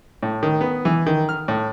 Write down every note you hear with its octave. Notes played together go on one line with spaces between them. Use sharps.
A2
D#3
B3
E3
D#3
F6
A2